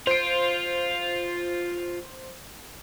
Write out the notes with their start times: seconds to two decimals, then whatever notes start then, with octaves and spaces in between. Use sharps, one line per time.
0.07 F4 C5 D7